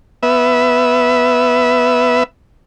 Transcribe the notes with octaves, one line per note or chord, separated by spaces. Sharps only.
B3 E5